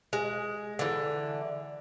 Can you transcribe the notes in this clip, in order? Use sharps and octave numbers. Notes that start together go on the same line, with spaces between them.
G#3
D3 E3